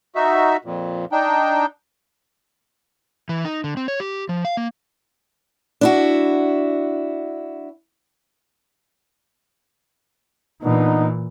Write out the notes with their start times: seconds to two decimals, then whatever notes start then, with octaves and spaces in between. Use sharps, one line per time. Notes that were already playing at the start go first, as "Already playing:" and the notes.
0.15 D#4 F#4 E5
0.64 F2 A#2
1.12 D4 D#4 G5
3.29 E3
3.45 D#4
3.64 D3
3.77 C4
3.88 C#5
4.00 G4
4.29 F3
4.45 F5
4.57 A#3
5.81 D4 E4 F#4
10.62 A#2 E3 B3 D4 D#4